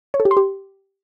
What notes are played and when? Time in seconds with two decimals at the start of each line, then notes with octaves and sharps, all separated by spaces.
0.14 C#5
0.20 A4
0.25 G4
0.31 C6
0.37 G4